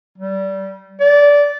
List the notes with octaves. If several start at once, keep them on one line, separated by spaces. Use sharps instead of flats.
G3
D5